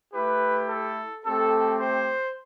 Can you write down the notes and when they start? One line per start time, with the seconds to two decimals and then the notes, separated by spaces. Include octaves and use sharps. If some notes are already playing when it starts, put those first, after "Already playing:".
0.14 A3 E4 G4 B4
0.69 A4
1.25 A3 C4 G4 A4
1.80 C5